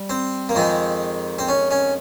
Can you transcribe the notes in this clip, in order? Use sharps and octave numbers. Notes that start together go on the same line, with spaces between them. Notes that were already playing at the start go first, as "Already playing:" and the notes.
Already playing: G3
C4
A#3
F2 D#3 G#3 C4
C4
C#4
C#4